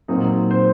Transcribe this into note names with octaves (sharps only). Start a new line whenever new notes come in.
A#2 F#3 C4 D#4
C5